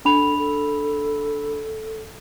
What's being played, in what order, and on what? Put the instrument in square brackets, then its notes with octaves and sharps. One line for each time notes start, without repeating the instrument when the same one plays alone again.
[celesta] D4 B5 F7 [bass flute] A4
[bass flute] A4